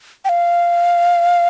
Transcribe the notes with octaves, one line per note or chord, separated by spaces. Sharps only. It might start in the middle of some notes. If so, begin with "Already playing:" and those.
G5
F5